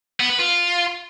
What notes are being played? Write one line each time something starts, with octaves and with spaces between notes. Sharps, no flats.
B3
B4
F4